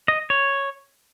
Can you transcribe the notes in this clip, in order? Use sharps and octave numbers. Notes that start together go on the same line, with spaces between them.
D#5
C#5